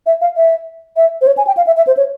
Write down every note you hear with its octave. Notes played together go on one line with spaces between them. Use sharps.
E5
F5
E5
E5
C5
C#5
G#5
G5
F5
E5
E5
C5
C#5